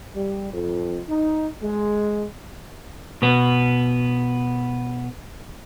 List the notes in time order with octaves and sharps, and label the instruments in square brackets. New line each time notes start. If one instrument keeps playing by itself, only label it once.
[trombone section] G3
F2
D#4
G#3
[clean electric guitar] B2 B3